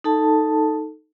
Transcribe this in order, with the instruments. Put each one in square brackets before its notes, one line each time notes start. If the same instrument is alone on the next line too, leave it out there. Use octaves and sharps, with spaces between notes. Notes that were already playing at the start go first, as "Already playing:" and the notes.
[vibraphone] D#4 A4 A5